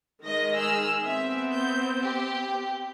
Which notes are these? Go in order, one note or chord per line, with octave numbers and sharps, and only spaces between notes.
D#3 G#3 D#5 A#6
G#4 E6 F6
B3 C4 E5
G6
G4